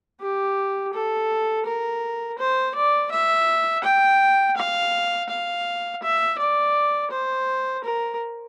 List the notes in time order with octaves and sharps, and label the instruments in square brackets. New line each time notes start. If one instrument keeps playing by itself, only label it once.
[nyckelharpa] G4
A4
A#4
C5
D5
E5
G5
F5
F5
E5
D5
C5
A#4